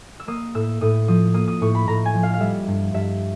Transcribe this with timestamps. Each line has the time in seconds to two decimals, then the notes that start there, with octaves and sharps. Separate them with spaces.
0.20 E6
0.28 A#3 D#6
0.55 A2 E6
0.81 A2 D#6
1.08 F3 D#6
1.34 A#3 D#6
1.48 D#6
1.61 A2 C#6
1.75 B5
1.88 A2 A#5
2.05 G#5
2.14 F3
2.23 F5
2.34 F5
2.40 G3 E5
2.68 G2
2.94 G2 E5